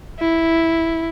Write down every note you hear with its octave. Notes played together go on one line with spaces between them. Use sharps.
E4